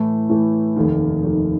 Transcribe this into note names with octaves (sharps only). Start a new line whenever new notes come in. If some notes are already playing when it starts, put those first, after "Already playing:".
Already playing: A2 E3 A3
A2 E3 A3
F1 D#2 D#3
F1 D#2 D#3